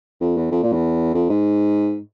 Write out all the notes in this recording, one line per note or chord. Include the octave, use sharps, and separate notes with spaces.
F2
E2
F2
A#2
E2
F2
G#2